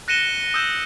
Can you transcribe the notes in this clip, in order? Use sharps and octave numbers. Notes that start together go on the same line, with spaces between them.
F#6 A#6 C#7 D#7 E7 G7
D#6 E6 G6 E7